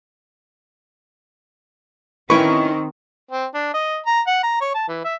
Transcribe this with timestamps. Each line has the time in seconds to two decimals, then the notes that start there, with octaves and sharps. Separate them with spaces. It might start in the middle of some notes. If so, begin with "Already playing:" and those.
2.30 D#3 C4 C#4 E4 B4 C#6
3.31 C4
3.54 D4
3.74 D#5
4.06 A#5
4.27 F#5
4.43 A#5
4.61 C#5
4.75 A5
4.89 E3
5.04 E5